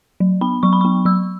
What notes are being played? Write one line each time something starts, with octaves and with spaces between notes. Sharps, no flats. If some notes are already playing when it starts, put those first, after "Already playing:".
F#3
B3 B5
F#3 C#6
B5
B3 C#6
F#3 E6